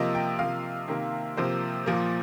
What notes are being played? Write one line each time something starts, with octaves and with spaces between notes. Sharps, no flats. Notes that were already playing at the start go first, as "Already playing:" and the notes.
Already playing: C3 F3 A#3 D#5
G5
C3 F3 A#3 F5
C3 D#3 A#3
C3 F3 A#3 C5
A#2 F3 A#3